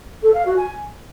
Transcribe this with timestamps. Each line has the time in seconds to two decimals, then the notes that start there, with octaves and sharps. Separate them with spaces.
0.23 A4
0.34 F5
0.45 F#4
0.57 G#5